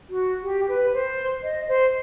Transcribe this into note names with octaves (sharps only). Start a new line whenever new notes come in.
F#4
G4
B4
C5
D#5
C5